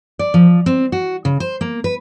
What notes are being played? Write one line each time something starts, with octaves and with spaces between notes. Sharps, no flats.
D5
F3
C4
F#4
C#3
C5
A#3
B4